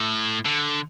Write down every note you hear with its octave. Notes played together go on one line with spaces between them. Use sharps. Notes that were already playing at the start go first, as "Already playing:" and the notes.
Already playing: A2
D3